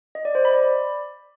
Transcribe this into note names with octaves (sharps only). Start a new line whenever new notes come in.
D#5
D5
C5
B5
D5